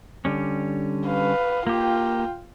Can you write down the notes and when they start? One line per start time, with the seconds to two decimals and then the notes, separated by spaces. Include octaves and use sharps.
0.25 D3 G3 C#4
1.07 B4 F5
1.67 A#3 F4 G4 G5